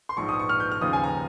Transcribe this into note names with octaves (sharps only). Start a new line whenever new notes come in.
C6
A#1 G#2 F3 C#6
D#6
C#6
F6
G6
F6
D#2 C#3 F3 D#6
G#5
A#5